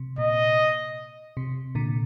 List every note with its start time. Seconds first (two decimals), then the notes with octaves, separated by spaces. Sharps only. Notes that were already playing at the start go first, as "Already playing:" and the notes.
Already playing: C3
0.18 A#2 D#5
1.37 C3
1.75 A#2 D3